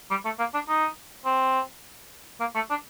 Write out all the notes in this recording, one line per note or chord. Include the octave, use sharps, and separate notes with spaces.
G3
A3
A#3
D4
D#4
C4
A#3
A3
D4